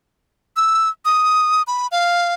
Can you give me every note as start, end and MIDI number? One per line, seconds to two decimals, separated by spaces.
0.56 0.90 88
1.05 1.63 87
1.67 1.87 83
1.92 2.34 77